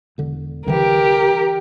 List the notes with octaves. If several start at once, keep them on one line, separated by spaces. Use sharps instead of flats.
E1 D3
C2 D3 E3 G4 A#4